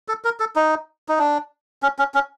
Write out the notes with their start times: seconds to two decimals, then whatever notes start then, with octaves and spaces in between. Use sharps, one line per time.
0.08 A4
0.25 A#4
0.40 A4
0.56 D#4
1.08 D#4
1.19 D4
1.83 C#4
1.99 C#4
2.14 C#4